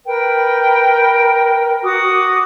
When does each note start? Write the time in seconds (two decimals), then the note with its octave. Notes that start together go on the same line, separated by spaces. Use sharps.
0.06 A#4 B4 G5
1.84 F#4 D6 D#6